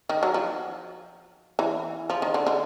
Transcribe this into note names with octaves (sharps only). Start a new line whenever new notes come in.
D#3
F#3
F3
E3
F3
D#3
D3
D3